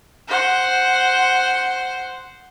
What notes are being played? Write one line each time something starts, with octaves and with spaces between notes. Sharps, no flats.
C5 F#5